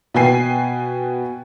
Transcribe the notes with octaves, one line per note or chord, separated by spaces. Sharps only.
B2 B4 G5 G#5 C7